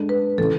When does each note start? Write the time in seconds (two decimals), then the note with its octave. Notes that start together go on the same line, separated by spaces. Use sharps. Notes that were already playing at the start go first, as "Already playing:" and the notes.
Already playing: G#3 D4 A4
0.09 B4
0.38 C#3 E3 A4